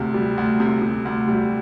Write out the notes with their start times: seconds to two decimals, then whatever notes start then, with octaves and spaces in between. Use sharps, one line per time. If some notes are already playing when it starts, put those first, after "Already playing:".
Already playing: D2 C3
0.14 G3
0.37 D2
0.60 C3
0.82 C3
1.05 D2
1.28 G3